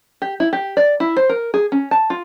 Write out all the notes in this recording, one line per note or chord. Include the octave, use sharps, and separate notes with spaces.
G4
E4
G4
D5
E4
C5
A#4
G#4
C#4
A5
F4